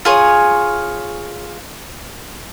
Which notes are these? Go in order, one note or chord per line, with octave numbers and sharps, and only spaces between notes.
F4 G#4 C#5